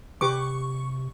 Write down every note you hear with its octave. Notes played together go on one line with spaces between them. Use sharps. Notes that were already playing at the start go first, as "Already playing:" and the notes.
C3 G4 B4 C#6 D6